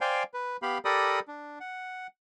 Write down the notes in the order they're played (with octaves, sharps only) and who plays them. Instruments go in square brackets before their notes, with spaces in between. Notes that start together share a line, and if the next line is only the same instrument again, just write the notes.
[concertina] C5 D5 F5 G5 G#5
B4
B3 G4 F5 B5
G4 A4 A#4 D5 B5 D#6
D4
F#5